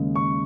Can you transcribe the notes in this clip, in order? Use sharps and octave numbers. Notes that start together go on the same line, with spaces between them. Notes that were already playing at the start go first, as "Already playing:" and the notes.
Already playing: D#2 C#3 G#3
C#6